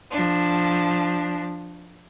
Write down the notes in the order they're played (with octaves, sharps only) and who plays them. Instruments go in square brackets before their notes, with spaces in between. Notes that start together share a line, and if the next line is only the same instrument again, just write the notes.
[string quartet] F3 D4